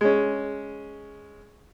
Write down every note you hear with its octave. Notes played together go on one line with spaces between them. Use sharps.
G#3 C#4